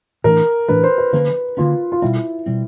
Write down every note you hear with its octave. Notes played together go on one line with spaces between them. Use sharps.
A2 E3 A3 D4 A#4
A2 E3 A3 D4 B4
C5
B4
D3 F3 A#3 C#4 B4
D3 F3 A#3 C#4 F4
F4
B2 G3 C4 E4
B2 G3 C4